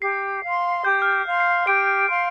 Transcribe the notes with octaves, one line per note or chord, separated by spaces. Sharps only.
G4 C7
F5 C6
G4 G6
F6
G6
F5 C6
C7
G4 D7
F5 C6